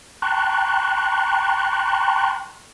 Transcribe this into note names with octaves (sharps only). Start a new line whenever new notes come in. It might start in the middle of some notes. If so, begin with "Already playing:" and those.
G5 A5 A#5 C6 C#6 F#6